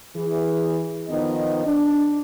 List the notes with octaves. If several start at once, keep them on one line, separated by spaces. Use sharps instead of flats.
E3 G#4
F2 D#3 F3 B3 D#4 D#5
D4